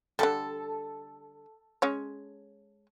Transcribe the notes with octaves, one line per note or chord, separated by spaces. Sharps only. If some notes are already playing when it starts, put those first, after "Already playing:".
D3 E3 G3 A4
G#3 C#4 C#5